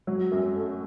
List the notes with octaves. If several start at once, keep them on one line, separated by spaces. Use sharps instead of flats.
F#3
F#2
A3